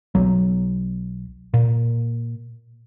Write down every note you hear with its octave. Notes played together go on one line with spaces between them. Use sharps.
B1 F#3
A#2